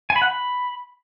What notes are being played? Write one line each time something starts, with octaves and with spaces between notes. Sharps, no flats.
G#5
B5
F#5
B5